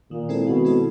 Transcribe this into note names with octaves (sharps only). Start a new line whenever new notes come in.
A#2 D#3
G#3 C4 E4 A4
B2 D#3
G#3 C4 E4 A4